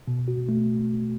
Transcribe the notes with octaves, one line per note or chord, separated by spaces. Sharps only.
B2
F#4
A3